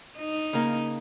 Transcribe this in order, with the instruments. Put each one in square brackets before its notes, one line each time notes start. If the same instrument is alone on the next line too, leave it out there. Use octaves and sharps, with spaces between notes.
[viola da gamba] D#4
[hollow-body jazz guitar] C#3 A#3